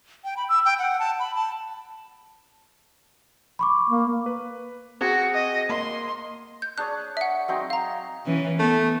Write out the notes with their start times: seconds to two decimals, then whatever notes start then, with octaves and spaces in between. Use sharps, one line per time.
0.24 G5
0.37 B5
0.49 E6
0.65 G5
0.79 F#5
0.99 A5
1.19 B5
1.35 A5
3.59 B5 C#6 D6
3.89 A#3
4.26 B4
5.01 C4 F#4 G#4 G#6
5.34 D#5
5.69 A#3 D#5 C6
6.62 G6
6.78 D4 G#4 C#5 F#6
7.17 E5 F#5
7.48 F#3 C4 D#4
7.70 F5 A#5
8.26 E3 C#4
8.59 A3 B3